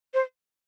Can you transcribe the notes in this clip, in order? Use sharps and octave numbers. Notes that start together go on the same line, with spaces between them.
C5